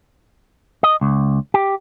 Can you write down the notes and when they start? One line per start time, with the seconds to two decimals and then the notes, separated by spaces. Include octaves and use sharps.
0.83 D#5
1.01 C#2
1.54 G4